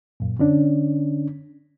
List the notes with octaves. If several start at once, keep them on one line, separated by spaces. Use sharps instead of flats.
F#2 A#2
D3 C#4 D4